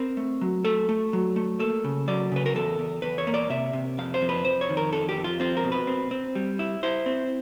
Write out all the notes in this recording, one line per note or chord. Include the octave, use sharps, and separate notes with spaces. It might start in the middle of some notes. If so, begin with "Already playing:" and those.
Already playing: C4 A#4
A3
F#3
A3 A4
A3
F#3
A3
A#3 A4
C#3
F#3 D5
C#3 B4
A#4
E2 A4
E2
E2 B4
C#5
A#3
D5
C3 E5
C3
F2 F5
C5
F2
B4
F2 C5
C#5
D#3
A#4
F2 A4
G4
F2
F4
C4 F4
A#4
B2
B4
C4
C4
G3
E4
E4 C5
C4